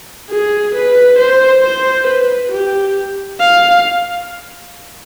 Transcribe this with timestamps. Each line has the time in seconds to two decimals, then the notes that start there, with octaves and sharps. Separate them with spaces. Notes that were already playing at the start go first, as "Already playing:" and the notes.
0.30 G#4
0.74 B4
1.18 C5
1.63 C5
2.06 B4
2.51 G4
3.40 F5